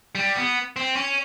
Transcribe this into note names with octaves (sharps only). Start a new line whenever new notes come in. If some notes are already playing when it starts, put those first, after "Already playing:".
G3
B3
C4
C#4